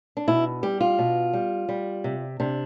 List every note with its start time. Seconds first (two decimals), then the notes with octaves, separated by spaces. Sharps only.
0.17 D4
0.28 B2 E4
0.63 G3 G4
0.80 F4
0.99 B2
1.33 G3
1.69 G3
2.04 C3
2.40 C3 D4